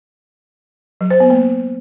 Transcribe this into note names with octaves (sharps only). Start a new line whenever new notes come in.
F#3
C5
B3
A#3